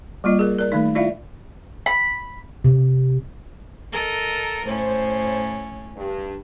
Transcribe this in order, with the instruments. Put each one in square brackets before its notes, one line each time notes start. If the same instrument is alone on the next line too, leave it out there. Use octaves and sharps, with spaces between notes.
[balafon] G3 A#3 F4 D#5
G#4 A#4
A#4 D5
D#3 A3 D#4
E4 F4 D5 E5 F5
[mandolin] B5
[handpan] C3
[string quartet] A4 A#4 D#5
[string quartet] A2 C#4 [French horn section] C5
[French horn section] G2